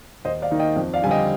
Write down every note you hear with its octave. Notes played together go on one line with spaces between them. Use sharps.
D#2 C5 D#5
D5 F5
D#3 A#3 D#4
D#5 G5
F2
D5 F5
D3 G3 C4 G#5
D#5 G5